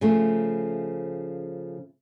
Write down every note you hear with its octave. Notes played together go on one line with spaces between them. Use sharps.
C#3 F3 A3